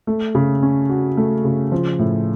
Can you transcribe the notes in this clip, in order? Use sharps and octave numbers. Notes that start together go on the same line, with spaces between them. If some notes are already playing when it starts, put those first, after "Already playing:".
A3
C#3
C#4
F#4
A3
C#3
F3
A2